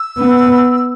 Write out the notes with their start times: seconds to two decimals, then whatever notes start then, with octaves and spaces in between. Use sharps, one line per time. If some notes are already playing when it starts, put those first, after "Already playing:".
Already playing: E6
0.18 B3